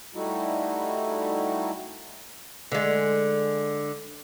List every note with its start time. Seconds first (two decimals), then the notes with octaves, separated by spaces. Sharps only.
0.15 G3 A3 D#4 E4 F#4
2.72 D3 G#3